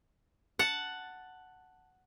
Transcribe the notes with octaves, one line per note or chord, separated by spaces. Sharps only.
F#5 A5